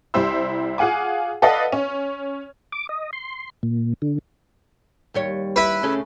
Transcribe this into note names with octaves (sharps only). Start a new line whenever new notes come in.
C2 G3 E4 C5 E6
F4 G#4 F5 F#5 G#5 D6
A4 B4 D5 D#5 F5 F#5
C#4
D6
D#5
C6
A#2
D3
D#2 G3 C#5
E4 B4
C#3 A3 C#4